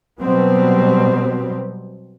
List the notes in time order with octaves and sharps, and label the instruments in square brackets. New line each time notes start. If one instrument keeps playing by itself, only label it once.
[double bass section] B2 F#3 G3 B3 C4